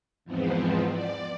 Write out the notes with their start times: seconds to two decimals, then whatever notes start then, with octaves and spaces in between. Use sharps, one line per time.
0.24 E2 G#2 F3 B3 C4
0.90 D5